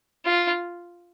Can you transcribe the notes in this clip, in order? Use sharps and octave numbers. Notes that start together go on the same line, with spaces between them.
F4